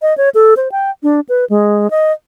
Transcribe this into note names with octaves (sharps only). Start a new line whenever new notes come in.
D#5
C#5
A4
C5
G5
D4
B4
G#3
D#5